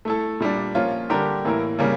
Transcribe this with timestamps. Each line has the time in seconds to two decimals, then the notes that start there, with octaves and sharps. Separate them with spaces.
0.05 A3 E4 A4
0.40 A#2 G3 D4
0.75 F3 A#3 C#4 F4
1.10 D3 G3 D4 G4 A#4
1.45 A2 E3 A#3 E4 A#4
1.79 C#3 G3 A#3